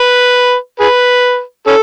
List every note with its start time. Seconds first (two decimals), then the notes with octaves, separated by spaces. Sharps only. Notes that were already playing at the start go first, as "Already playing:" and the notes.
Already playing: B4
0.80 G#4 B4
1.67 C#4 A4